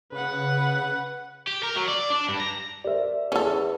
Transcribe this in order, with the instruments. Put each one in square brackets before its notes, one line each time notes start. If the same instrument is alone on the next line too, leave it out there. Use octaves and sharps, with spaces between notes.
[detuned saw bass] C#3 [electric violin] B4 F#5
[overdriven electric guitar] G4
A#4
F#3
D5
D4
G2
A#5
[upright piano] G4 A#4 E5 [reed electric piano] C5 D5
[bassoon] E2 [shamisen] C#4 A4